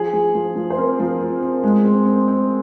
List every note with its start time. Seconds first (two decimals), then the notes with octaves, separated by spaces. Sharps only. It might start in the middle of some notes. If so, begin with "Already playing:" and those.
Already playing: F3 G#4
0.13 F3
0.35 F3
0.56 F3
0.70 C5
0.78 C4 A#4
1.00 F3
1.21 C4
1.42 C4
1.63 G#3
1.84 C4
2.06 C4
2.28 C4